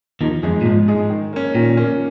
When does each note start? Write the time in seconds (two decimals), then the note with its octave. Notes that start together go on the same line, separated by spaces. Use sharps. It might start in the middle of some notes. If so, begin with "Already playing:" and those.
0.21 D#2 D#3 F3
0.43 F2 G#3 D#4 G#4
0.61 A#2
0.65 G#2 F3
0.88 G#3 D#4 G#4
1.10 D#3
1.33 A#3 C#4
1.54 A#2 D#3
1.77 A#3 C#4